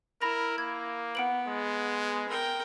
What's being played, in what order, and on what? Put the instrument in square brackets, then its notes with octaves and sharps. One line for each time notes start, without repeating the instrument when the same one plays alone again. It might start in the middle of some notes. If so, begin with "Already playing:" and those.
[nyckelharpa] E4 [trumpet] A#4 [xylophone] B5 A#6 F7
[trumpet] A#3 [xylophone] G#6
[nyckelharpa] B3 [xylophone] F#5 D7 F#7
[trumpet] G#3
[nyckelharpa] A#4 G5